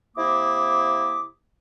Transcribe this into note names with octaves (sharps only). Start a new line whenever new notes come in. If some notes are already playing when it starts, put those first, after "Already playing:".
C3 A#3 E4 D6 D#6